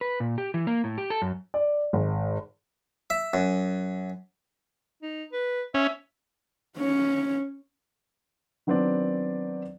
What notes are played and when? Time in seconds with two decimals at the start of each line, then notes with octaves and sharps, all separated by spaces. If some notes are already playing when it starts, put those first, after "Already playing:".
0.01 B4
0.20 A#2
0.38 G4
0.54 E3
0.67 A#3
0.84 A2
0.98 G4
1.10 A4
1.22 F#2
1.54 D5
1.93 G#1
3.10 E5
3.34 F#2
5.02 D#4
5.33 B4
5.74 C#4 E5
6.78 C#4 C#5
8.67 D#3 F#3 B3 C4 D4 D5